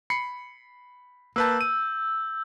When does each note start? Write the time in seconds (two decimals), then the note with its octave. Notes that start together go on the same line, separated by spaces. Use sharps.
0.10 B5 C7 C#7
1.36 A#3 B4 A5 E6 G6
1.61 D#7